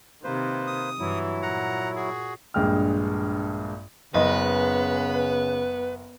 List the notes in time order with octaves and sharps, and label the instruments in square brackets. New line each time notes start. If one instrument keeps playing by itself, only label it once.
[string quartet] C3 D#3 [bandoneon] A#3 B4 C5
[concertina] D#6
[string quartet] G2 E3 [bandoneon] F#3 E4
[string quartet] A#2 [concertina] F#5 A#5
[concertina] F#4 G#4
[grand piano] A#1 G2 G#3 G5 F6
[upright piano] F#1 D#5 [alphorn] C#3 [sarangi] B3 [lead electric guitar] B4